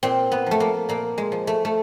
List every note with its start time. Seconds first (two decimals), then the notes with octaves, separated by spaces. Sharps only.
0.03 A#2 C4
0.32 B3
0.46 F3 A3
0.60 A#3
0.89 A#2 A#3
1.18 G#3
1.32 F3
1.47 A3
1.65 A3